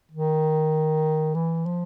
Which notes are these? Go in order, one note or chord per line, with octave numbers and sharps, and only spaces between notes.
D#3
E3
F3